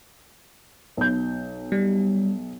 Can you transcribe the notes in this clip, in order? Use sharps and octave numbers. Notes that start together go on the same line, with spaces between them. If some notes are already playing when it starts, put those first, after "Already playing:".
B1 G6
G3